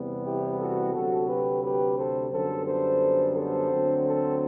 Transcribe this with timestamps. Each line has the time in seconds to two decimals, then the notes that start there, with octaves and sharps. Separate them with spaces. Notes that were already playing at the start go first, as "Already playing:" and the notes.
Already playing: E2 C3 G3 B3
0.24 E4 G4
0.59 F#4 A4
0.93 D2 C3 F#3 F#4 A4
1.28 G4 B4
1.63 G4 B4
1.98 A4 C5
2.32 F#2 D3 G3 B3 A4 C5
2.67 A4 C5
3.36 A4 C5
3.71 D2 D3 F#3 C4
4.05 A4 C5